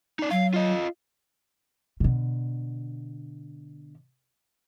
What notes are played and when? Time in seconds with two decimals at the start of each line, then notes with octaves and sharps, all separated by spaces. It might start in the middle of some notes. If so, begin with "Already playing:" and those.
0.19 D#4 D5
0.31 F#3 F5
0.54 F4 D#5
2.00 B2 D3